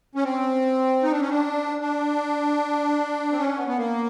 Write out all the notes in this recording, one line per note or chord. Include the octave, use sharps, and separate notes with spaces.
C#4
C4
D#4
D4
C#4
D4
D4
C4
C#4
B3
B3
A#3